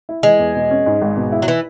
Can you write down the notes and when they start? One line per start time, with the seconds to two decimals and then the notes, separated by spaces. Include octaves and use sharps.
0.09 E4
0.23 E3 G#3
0.39 E2
0.55 B2
0.71 C#4
0.86 G#2
1.02 G#1
1.17 B2
1.32 E4
1.42 F#3
1.48 E3